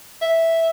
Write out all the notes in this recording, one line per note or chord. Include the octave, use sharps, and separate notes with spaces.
E5